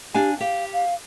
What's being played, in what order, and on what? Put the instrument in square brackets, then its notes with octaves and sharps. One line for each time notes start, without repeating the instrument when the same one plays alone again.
[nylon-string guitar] D4 F5 G#5 [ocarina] G4
[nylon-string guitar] G4 [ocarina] F5
[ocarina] F5